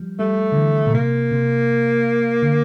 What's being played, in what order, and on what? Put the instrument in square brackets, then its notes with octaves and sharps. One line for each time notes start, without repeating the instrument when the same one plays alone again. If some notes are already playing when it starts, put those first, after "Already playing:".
Already playing: [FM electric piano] F3 G3
[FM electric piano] G3 [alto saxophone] A3
[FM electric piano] D3
E3
A#2
[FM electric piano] C3 [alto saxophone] A#3
[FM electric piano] C3
D3